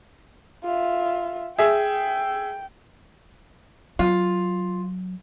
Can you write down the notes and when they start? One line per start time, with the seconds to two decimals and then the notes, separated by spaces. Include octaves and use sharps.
0.64 F4 E5
1.58 G#4 E5 G5
3.99 F#3 F4